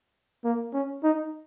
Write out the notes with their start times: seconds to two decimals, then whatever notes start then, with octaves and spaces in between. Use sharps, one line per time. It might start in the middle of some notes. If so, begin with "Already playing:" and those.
0.44 A#3
0.74 C#4
1.04 D#4